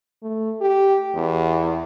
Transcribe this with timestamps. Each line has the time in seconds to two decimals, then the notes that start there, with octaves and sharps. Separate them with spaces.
0.23 A3
0.61 G4
1.14 E2